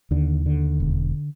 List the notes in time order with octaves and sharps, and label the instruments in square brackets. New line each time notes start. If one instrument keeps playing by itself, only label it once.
[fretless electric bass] D#2 D3
D3
E1